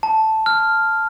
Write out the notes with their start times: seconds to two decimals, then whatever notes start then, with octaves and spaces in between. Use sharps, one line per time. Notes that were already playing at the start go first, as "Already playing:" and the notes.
0.03 A5
0.46 F6